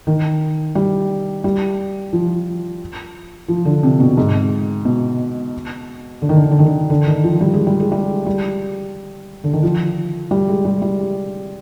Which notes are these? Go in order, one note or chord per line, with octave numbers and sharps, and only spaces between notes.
D#3
G3
G3
F3
F3
D3
C3
B2
G#2
B2
D3
D#3
D3
D#3
D3
D#3
D3
D3
D#3
F3
G3
G#3
G3
G#3
G3
G3
D3
D#3
F3
G3
G#3
G3
G3